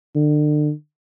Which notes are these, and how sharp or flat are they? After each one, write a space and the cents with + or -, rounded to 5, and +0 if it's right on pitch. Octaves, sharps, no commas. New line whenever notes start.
D3 +35